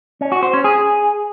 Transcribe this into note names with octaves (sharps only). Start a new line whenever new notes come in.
C#4
F#4
C5
C#4
G#4